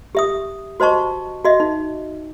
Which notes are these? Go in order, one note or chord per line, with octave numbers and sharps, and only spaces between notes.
G4 E5 D#6
F#4 C5 D#5 A5 C#6
F#4 D#5 E5
D#4